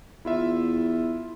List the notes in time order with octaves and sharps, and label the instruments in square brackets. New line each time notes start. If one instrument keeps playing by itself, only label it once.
[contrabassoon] E2 [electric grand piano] E4 F4 E5